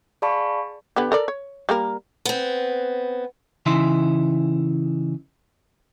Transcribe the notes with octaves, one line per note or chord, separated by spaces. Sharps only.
G#4 D5 F5 A5 B5 C#6
D3 B3 G4
A4 A#4 D5
C#5
G3 A#3 A#4
B3 C4
C#3 E3 D#4 E4 E5 C6